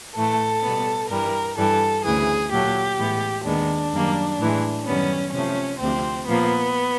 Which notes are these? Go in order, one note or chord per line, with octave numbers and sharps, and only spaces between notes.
A2 E3 A3 A4
B2 G3 B3
G2 E3 G3 A#4
G2 E3 G3 A4
D2 C#3 E3 G#4
A#2 F#3 A3 G4
A2 E3 G#3 B3
D#2 D#3 G#3 B3 D4
F#2 D#3 G3 A#3
A2 E3 G#3
F#2 D#3 G3 B3 C#4
C3 F3 A3 C#4
D2 C3 F3 C4
A#2 F3 A#3 B3